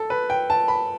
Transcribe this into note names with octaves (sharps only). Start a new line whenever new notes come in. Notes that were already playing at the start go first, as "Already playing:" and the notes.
Already playing: A4
B4
G5
A5
B5